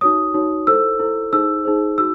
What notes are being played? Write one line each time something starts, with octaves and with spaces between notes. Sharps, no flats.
D#4 F#4 C#5 D#6
D#4 F#4 C#5
E4 A4 C5 E6
E4 A4 C5
D#4 G#4 C5 E6
D#4 G#4 C5
D#4 F#4 E6